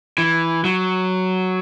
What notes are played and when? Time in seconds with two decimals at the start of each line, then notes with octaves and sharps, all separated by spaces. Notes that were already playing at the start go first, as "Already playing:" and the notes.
0.18 E3
0.65 F#3